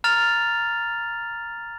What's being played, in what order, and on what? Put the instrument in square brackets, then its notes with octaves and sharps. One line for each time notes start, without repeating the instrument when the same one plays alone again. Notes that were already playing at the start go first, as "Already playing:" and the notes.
[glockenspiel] A#5 F6 A6 F7